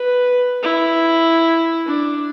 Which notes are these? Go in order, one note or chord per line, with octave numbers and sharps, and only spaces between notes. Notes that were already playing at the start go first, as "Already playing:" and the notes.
Already playing: B4
E4
D4